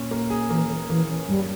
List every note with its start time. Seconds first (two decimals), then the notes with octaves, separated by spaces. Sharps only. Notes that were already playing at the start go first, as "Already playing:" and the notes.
Already playing: A#2 C#4
0.11 A#3
0.30 G#4
0.50 E3 A#3
0.70 A#3
0.89 E3 A#3
1.09 C#4
1.28 G2 G3